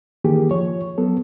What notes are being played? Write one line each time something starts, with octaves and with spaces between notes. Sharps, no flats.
D#3 E3 A#3 G4 G#4
F3 C#5
F#3 B3 A4